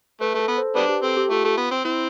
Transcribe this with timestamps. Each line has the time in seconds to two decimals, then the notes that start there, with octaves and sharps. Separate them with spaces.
0.21 A3 B4
0.35 A3
0.40 A4
0.48 B3
0.58 C5
0.76 G3 B3 D4 B4
0.89 G4
1.03 C4 A4
1.17 G4
1.30 A3 F4
1.45 A3
1.57 B3
1.71 C4
1.85 C4 E4